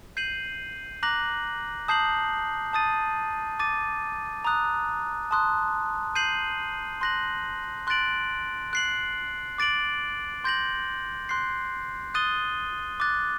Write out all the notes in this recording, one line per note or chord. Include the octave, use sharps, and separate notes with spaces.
G6 C7 D#7 F#7
A#5 D6 F#6 A#6 F#7
A5 D#6 G6 C7 F#7
A5 D#6 A6 D#7
D6 A6 D#7
A#5 D#6 F#6
A5 C6 D#6 F#6
G6 C7 D#7 F#7
C6 F#6 A#6 F#7
C6 F#6 A6 D7 F#7
F#6 C7 F#7
D6 A6 D7 F#7
C6 G6 A#6 F#7
C6 F#6 C7
D#6 F#6 A6 D#7 G7
D6 F#6 A6